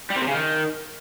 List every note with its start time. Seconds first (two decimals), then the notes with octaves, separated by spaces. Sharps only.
0.11 G3
0.16 C4
0.22 C3
0.28 C#3
0.34 D#3